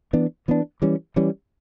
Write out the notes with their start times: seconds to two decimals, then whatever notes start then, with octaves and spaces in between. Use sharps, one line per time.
0.13 E3 B3 D4
0.48 E3 B3 D4
0.82 E3 G3 C#4
1.16 E3 G3 C#4